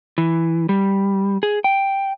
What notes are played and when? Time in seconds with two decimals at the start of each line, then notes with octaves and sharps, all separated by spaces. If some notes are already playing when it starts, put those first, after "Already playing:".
0.18 E3
0.69 G3
1.43 G#4
1.64 G5